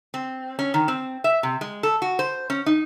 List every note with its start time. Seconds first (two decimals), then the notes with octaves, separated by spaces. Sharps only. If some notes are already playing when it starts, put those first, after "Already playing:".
0.14 C4
0.59 C#4
0.74 D#3
0.88 C4
1.24 E5
1.43 C3
1.61 G#3
1.83 A4
2.02 F#4
2.19 C5
2.50 C#4
2.66 D#4